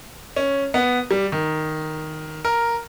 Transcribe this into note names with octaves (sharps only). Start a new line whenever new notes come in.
C#4
B3
G3
D#3
A#4